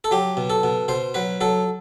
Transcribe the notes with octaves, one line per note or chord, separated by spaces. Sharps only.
A4
F#3 G4
B2
A4
B2
B2 C5
F#3 B4
F#3 A4